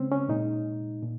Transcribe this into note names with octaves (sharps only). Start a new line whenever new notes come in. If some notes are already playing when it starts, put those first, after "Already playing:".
Already playing: C#3 G#3 C4 C#4
C#4
A#2 G#3 D#4
A#2